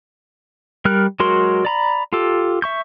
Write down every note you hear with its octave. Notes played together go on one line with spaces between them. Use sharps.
G3 A#4 F6 F#6
F#3 G#3 F#4 A#4 C6
D5 A#5 B5
F4 G4 A4
E5 C#6 G6